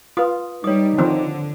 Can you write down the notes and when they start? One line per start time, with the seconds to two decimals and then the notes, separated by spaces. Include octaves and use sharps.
0.17 F4 B4 D#6
0.64 G3 D#4 C#5 D#6
0.98 D3 D#3 F3 C4